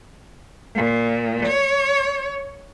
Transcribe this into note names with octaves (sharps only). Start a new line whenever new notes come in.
A#2
C#5